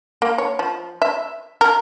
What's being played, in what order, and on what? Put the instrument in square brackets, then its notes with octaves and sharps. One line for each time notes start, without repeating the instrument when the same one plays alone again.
[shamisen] A#3
C#5
F3
E5
A#4